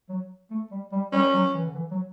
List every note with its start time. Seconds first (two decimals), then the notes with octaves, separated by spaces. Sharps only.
0.09 F#3
0.51 A3
0.71 G3
0.92 G3
1.12 G3 C#4
1.34 F#3
1.54 E3
1.66 D3
1.75 E3
1.91 F#3